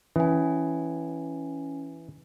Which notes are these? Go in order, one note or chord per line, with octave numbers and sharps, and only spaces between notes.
E3 C#4 G#5